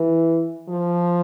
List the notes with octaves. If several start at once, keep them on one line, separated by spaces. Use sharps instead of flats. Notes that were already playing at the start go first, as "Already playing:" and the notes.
Already playing: E3
F3